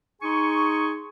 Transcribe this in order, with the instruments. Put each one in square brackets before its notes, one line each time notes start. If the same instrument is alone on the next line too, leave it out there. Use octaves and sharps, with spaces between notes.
[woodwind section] D#4 G#4 G#5 C6 C#6